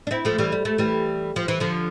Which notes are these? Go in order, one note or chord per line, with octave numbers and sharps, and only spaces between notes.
D4
C4 E4
F3 A3
E3 G3
G3
A3
E3 G3
F3
E3
D3 F3